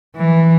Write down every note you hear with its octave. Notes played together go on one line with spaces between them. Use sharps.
E3